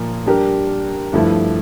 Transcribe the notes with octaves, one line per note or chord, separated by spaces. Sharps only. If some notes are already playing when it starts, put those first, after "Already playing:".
Already playing: A#2 F3 A#3
G3 D4 G4 A#4
G2 F3 A3 E4